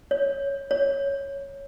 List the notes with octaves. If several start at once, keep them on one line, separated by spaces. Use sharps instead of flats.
C#5
C#5